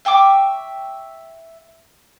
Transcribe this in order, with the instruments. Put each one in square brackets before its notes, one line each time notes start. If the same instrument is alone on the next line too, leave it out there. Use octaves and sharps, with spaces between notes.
[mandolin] E5 G5 C#6 D6